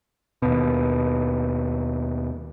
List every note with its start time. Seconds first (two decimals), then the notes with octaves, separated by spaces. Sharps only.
0.42 D#2 B2